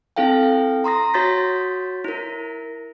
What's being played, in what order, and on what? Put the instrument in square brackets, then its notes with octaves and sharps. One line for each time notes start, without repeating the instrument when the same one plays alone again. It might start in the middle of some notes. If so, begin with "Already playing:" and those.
[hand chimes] C4 E4 A4 F5 G5
A#5 C6 D#6 A#6
F#4 C#5 C6 G6 A6 B6
E4 A#4